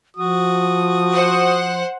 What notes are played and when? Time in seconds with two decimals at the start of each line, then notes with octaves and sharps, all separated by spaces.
0.16 F3 F#4 D#6
1.12 C5 F#5